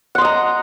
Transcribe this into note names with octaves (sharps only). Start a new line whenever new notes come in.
D#5 F#5 A#5 C6